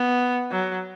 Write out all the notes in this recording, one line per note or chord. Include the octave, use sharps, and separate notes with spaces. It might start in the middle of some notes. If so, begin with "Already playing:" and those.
Already playing: B3
F#3